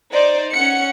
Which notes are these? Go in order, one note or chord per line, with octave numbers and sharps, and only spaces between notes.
D#4 C5 D5
C#4 F#5 C#7